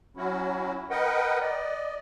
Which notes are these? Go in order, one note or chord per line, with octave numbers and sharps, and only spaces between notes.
F#3 C#4 E4 F#4
A#4 B4 D#5 F#5 G5
D5 D#5